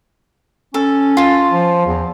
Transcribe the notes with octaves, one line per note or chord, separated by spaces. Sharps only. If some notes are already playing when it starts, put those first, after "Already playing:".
C#4 A4
F4 A5
F3
E2